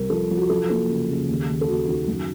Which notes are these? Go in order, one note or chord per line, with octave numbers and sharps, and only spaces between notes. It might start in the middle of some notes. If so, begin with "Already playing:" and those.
Already playing: C2 C3 A#4
F3 A4
F3
F#4
F#3 A4
A#3 A4
C#3
C#3
D#2
D#2
A4
D#2 F#4
D#3 F#4
F#2